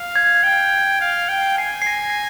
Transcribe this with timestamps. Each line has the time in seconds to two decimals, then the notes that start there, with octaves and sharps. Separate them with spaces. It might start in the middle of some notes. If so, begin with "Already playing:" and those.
Already playing: F5
0.16 G#6
0.43 G5
1.01 F5
1.29 G5
1.57 G#5 C7
1.82 C7
1.87 A#6
2.10 C7